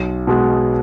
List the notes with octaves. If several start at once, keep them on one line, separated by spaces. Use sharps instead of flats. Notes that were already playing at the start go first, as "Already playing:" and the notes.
Already playing: B1
B2 G#3 B3